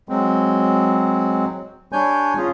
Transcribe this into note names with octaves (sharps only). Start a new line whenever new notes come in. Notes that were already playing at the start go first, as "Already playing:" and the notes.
F#3 G#3 C4
G3 D4 C#5 G#5 G6
C#4 F4 G#4